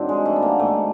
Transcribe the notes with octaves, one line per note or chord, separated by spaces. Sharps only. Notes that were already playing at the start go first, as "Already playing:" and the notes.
Already playing: G2 D#3 F#3 C4 D4
G#3
A3
B3
A#3
G#2 D#3 F#3 A3